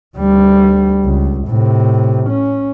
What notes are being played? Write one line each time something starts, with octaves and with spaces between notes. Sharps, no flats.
D2 G3
C#2
A2 C3
C#4